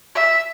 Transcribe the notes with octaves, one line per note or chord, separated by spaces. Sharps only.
E5